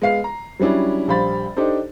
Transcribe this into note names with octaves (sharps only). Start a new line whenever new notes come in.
G#3 B3 F5 C7
A#5
F#3 G3 C#4 D4 E4
A#1 G3 C5 F5 B5 A6
D4 D#4 G4 A4 C5